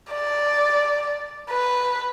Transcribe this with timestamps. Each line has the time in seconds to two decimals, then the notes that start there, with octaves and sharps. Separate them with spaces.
0.13 D5
1.51 B4